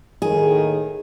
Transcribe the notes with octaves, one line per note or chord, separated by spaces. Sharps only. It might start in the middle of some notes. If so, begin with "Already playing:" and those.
D#2 A2 D#3 G#4